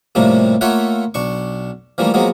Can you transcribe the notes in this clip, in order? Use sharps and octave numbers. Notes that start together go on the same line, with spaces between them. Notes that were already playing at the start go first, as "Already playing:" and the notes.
A2 C3 F3 G3 A3 A#3
A3 A#3 F4 C#5 E5 F#5
B1 D4 C#6
E3 F3 G3 A3 A#3
F3 F#3 G#3 A#3 B3